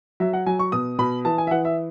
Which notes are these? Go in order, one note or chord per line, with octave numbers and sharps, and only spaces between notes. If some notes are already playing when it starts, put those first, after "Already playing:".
F#3 E5
F#5
F#3 G#5
C#6
B2 D#6
B2 B5
E3 A5
G#5
E5
E3 F#5
E5